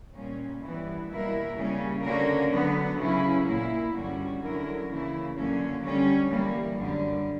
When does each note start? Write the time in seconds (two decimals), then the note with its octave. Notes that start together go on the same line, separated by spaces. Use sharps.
0.13 A#2 G3 A#3 C#4
0.61 G2 E3 G3 B3 E4
1.08 B2 G3 A#3 E4 A#4
1.55 C#3 G3 A#3 C#4
2.03 D3 A#3 C#4 F#4 A#4
2.50 D3 F#3 B3
2.98 C#3 F#3 C#4 E4
3.45 A#2 A#3 E4
3.92 G2 D3 G3 C#4 F#4
4.39 D3 F#3 C#4 E4 A#4
4.87 C#3 E3 A#3 E4
5.34 F#2 D3 F#3 A#3 C#4
5.81 D3 G3 C#4
6.29 E3 G3 A#3
6.76 F#2 D3 G3